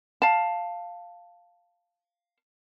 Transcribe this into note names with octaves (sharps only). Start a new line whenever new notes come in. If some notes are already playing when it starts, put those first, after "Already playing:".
F5 A5